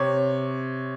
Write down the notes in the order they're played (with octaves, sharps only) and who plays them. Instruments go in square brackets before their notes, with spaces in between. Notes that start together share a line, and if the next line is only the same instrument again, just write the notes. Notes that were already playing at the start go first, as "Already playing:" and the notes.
Already playing: [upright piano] C3 C#5